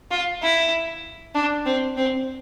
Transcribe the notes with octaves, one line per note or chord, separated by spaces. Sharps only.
F4
E4
D4
C4
C4